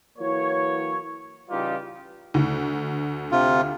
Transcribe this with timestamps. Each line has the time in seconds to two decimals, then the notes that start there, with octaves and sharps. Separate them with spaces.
0.17 E3 F#3 A#3 C#5
1.49 C#3 E3 G3 D#4 F4 G4
2.34 D2
3.32 C3 F4